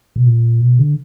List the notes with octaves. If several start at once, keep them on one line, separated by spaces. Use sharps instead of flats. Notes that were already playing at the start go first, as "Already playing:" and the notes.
B2
A#2
B2
D3